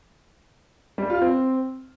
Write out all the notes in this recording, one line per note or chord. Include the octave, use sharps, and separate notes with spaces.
G3
F4
C4